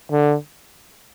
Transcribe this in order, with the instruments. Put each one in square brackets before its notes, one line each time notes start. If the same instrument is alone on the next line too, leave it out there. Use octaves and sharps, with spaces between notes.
[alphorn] D3